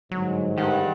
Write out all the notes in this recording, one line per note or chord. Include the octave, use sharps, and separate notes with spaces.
G1 G#2 F#3
G2 D#3 G4 F#5